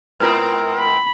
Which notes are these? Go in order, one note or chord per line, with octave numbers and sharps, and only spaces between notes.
G#2 B3 C4 F4 A#4 B4
B5